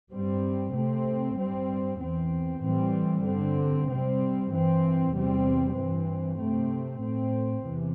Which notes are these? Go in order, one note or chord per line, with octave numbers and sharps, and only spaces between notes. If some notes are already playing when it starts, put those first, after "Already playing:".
G2 G3 C4
C3 A3 C4
G2 G3 C4
E2 E3 C4
A2 E3 G3 C4
G2 D3 C4
C3 G3 C4
G2 E3 C4
E2 C3 G3 C4
G2 E3 C4
C3 A3 C4
A2 A3 C4
E2 C3 E3